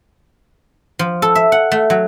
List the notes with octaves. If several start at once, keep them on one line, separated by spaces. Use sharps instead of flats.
F3
A4
E5
F#5
A3
F#3